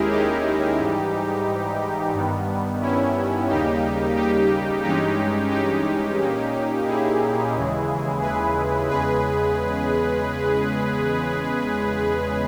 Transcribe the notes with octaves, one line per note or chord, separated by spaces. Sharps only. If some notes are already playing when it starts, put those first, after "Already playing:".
Already playing: D#2 D#3 G#3 C#4 E4 G4 G#4 A#4
D#4 G4
G#2 E3 G3
G2 D#3 G3 B3
C#4 E4
D#2 C#3 G3 A#3 D#4 G4
D#4 G4
G2 E3 G#3 C#4 D#4 G4
D#4 G4
A#2 A#3 C#4
E4 G#4
D#2 C#3 E3 G#3
G#4 B4
E2 C#3 G#3 G#4 B4